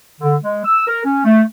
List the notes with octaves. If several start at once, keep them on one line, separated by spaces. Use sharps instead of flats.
D3
G#3
E6
A#4
C#4
A3